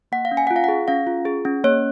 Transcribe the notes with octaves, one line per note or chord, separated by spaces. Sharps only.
A#3 F#5
F5
C#4
G#5
F4 F#5
F5
F#5
G#4
C#4 F5
F4
G#4
C#4
A#3 C#5